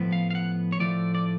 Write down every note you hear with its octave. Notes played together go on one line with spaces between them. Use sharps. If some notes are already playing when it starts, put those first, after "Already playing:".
Already playing: A2 F3 B3
F5
F5
F#5
C#5
A2 F3 A3 D5
D5